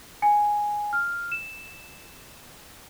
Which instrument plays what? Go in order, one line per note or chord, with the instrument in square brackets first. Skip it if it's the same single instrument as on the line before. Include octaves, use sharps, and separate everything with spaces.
[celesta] G#5
F6
E7